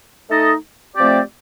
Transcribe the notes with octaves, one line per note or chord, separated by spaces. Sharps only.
A3 D#4 A4 D#5
F3 A3 C4 G4 D5